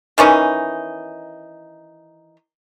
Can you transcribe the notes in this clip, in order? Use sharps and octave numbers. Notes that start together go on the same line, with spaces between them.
D#3 E3 C#4 D#4